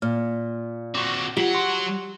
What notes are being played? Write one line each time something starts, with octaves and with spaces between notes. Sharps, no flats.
A#2 F6
C4 F#4 C#6 D6
F#3 F4 G4 F#5
C6 C#6 D7